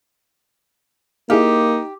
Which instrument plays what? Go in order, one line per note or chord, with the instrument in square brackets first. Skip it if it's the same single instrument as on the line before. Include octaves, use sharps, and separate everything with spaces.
[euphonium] A#3 [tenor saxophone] D#4 [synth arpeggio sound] E4 G#4 F5 [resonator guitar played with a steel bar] G4